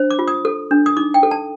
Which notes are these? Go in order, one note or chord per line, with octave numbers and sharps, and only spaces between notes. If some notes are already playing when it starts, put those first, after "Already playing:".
Already playing: D4 C5
D6
F4
D#6
A4
D4
D#6
D#4 D6
G5
A4
A5